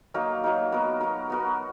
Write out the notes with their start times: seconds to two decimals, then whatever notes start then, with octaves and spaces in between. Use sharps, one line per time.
0.14 F#3 A#3 D#4 A#4
0.44 F#3 A#3 D#4 A#4
0.72 B3 F#4 A#4
1.01 B3 F#4 A#4
1.30 B3 F#4 A#4